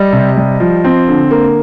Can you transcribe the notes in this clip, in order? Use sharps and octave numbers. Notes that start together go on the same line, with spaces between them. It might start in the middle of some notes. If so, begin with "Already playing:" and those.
Already playing: G3 D#5
C3
G3
F3
C4
D3
A#3